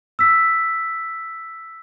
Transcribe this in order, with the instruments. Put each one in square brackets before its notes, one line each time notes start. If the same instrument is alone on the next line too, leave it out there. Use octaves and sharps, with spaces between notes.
[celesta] E6 B6